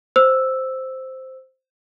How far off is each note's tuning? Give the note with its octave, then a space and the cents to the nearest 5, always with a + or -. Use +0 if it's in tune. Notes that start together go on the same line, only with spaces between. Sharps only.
C5 +0 E6 +0